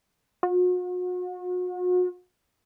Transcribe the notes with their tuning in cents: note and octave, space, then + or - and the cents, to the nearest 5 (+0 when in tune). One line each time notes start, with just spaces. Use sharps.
F#4 -40